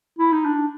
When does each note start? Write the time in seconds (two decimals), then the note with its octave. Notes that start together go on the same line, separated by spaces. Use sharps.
0.19 E4
0.32 D#4
0.45 D4